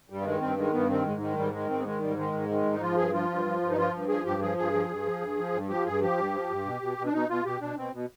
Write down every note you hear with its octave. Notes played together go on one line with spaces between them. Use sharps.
G2 G3
B3
D#3 G#3
G2 C4
D#3 G#3
G2 B3
D#3 C4
G#2 G#3
D#3 G#3
G#2 G3
D#3 G#3
G#2 C4
B3
D#3 G#3
G#2 G3
D#3 G#3
G#2
D#3
G#2
D#4
F3 F4
G2 G#4
F3 F4
G2
F3
G2
D#4
F3 F4
G2
F3 G#4
G2 G4
F3 G#4
G2 G#4
F3
G2
F3
G2
F3
G2
F3 G4
G2 G#4
F3 G4
G2
F3
G2
B2
B2
B2
D4
B2 D#4
B2 F4
B2 G4
B2 D4
B2 C4
B2